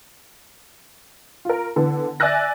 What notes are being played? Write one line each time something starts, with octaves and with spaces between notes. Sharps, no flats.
F4 A#4
D3 E3 B3
D5 E5 G#5 E6 F#6 A#6